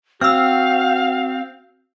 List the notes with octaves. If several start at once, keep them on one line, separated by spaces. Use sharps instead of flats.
C4 F#4 F5 E6 F6